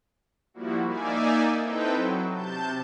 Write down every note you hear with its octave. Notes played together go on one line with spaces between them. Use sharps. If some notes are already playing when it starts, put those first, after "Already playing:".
F3 G3 A#3 E4 F#4
A#3 D#4 D5 E5 G#5
C4 D#4 E4 A4 B4 G5
F#3
C3 A5 G6